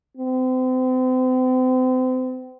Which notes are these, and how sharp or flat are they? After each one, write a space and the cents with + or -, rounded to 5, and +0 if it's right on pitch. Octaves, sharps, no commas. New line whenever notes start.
C4 -35